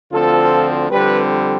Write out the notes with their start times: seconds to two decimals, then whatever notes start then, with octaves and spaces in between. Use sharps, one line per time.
0.11 D2 D3 F3 C4 F4 A4
0.91 F2 D3 G3 C4 G4 B4